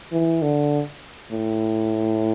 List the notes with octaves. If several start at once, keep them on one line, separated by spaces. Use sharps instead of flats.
E3
D3
A2